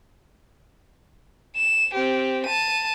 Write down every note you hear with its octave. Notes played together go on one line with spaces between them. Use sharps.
E7
C4 G4
A5 D#7